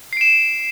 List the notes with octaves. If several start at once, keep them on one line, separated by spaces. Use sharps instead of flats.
C7 D7 E7